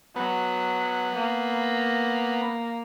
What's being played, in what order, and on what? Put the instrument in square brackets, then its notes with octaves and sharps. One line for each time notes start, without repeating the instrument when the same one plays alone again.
[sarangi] F#3 [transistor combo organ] B3
[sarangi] A#3